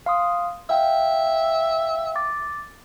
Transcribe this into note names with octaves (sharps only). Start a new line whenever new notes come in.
F5 C6 D#6
E5 F5 G5
D6 A6